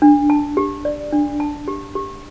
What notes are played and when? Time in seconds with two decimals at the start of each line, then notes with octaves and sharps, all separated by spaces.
0.02 D4
0.30 A5
0.57 G4
0.85 D5
1.12 D4
1.40 A5
1.68 G4
1.95 G4